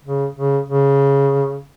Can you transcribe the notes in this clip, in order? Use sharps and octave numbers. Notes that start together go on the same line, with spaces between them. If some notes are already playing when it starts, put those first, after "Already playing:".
C#3
C#3
C#3